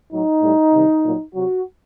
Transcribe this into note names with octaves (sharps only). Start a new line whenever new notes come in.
A2 F#3 D#4
A2 G3
C3 D#3 G3
A#2 F#3
C3 F#3 F#4